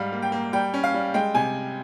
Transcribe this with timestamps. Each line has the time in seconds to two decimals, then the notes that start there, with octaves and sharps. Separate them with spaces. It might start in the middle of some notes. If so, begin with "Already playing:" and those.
Already playing: G#2 G3 F5
0.12 A#3
0.22 G5
0.32 A#3
0.53 G3 G5
0.74 C#4
0.84 F5
0.94 G3
1.14 G#3 G5
1.34 C3 G#5